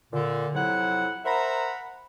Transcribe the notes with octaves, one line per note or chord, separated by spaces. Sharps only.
A#2 D3
F2 C3 F#3 E4 F#5
A#4 C5 E5 F#5 A#5 B5